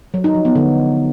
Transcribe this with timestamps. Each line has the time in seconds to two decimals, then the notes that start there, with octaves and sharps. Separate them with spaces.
0.14 F#3
0.24 D#4
0.35 F3
0.45 B3
0.55 D3